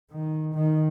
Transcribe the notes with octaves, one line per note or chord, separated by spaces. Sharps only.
D#3
D#3